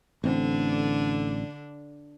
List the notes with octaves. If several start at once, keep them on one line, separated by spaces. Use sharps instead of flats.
A1 D3 C4 D4